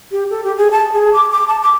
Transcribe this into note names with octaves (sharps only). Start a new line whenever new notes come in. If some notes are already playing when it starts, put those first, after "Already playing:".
G4
A4
G4
G#4
A5
G#4
D6
D6
A5
D6